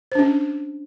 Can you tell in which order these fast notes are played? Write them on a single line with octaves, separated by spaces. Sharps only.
C5 D4 C#4